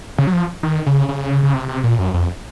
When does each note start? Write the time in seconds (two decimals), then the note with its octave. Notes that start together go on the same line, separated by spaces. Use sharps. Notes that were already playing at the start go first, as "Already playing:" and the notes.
0.18 C#3
0.27 F#3
0.33 F3
0.63 D#3
0.86 C#3
1.09 C#3
1.43 C#3
1.54 C3
1.68 C3
1.84 A#2
1.99 F#2
2.14 F2